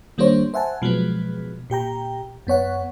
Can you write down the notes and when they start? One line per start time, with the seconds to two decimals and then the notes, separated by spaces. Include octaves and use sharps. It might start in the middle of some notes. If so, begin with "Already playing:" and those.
0.18 D#3 G3 A#3 D4 C5 C#5
0.54 C5 E5 F#5 G#5 A5
0.82 B2 F3 F#3 G#3 B3
1.70 A#2 G4 G5 A#5
2.47 F#2 B3 C#5 F#5